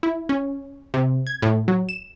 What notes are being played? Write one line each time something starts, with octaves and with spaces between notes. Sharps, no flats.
E4
C#4
C3
G#6
A2
F#3
E7